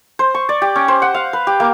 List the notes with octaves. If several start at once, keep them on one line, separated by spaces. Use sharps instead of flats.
C5
C#6
D5
G4
C#4
C5
F#5
F5
B4
G4
A#3